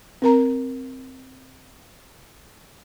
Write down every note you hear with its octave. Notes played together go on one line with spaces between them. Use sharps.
C4 A#4 A#5